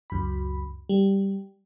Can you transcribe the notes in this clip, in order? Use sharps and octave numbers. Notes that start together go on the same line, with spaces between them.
C#2 F#2 B5
G3